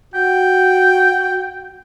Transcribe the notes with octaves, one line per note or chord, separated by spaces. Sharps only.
F#4 G5